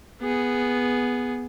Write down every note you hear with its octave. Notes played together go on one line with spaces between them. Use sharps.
B3 G#4